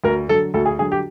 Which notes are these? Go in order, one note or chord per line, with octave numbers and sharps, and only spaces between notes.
D2 A#4
D3 F#3 A4
D2 A4
G#4
D3 F#3 G#4
G4